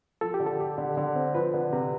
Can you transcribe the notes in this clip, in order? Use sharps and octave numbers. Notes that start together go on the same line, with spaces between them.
F3 A4
G4
D3
A4
G4
D3
D3
C4
F3 B4
D3
C3